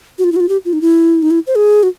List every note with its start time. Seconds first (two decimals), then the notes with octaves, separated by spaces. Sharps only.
0.19 F#4
0.24 F4
0.32 E4
0.36 F#4
0.40 F4
0.49 G4
0.65 F4
0.73 D#4
0.81 E4
1.22 D#4
1.31 E4
1.47 C5
1.55 G#4
1.83 F#4